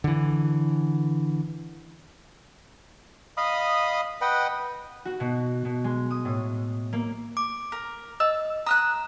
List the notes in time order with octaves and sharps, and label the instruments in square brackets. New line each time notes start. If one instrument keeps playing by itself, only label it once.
[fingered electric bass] D3 E3
[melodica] D#5 F5 B5 D#6
B4 D#5 F#5 G5
[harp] F#4
B2
B2
G#3
D#6
A2
A#3
[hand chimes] D6
[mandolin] A#4
[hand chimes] D#5 [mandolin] E6
[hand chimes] A#5 [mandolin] D#6 F6 F#6